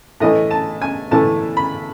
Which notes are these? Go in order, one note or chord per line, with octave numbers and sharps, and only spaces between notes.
A2 E3 A3 D#5
A5
G#5
A2 E3 A3 A5
B5